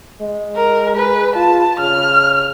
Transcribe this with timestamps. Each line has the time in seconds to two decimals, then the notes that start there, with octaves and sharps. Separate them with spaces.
0.21 G#3
0.56 A#4
0.96 G#4 B4
1.36 F4 A5
1.80 C#3 F6